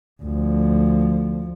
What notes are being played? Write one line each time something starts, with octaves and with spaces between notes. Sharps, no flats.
D2 F3